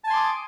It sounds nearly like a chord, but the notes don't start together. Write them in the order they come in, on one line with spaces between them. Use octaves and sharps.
A5 G#5 C6 D6 D#6